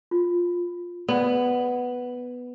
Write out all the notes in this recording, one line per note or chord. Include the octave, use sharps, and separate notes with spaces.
F4
B3 D5